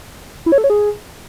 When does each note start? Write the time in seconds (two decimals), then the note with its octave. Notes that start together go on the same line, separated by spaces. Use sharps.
0.46 E4
0.52 C#5
0.58 A4
0.64 C#5
0.70 G#4